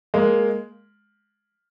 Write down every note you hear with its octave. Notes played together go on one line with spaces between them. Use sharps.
G#3 A#3